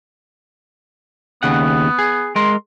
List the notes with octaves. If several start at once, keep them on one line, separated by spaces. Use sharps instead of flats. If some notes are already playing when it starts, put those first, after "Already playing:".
D#2 C#3 B3 F#5
G#4
G#3 A#4 C6